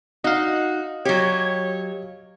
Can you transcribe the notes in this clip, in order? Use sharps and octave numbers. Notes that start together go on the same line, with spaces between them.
D#4 F#4 D#5 F5
F#3 G4 C#5